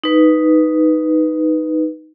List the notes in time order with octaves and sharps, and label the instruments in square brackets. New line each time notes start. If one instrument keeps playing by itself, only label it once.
[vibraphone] D#4 B4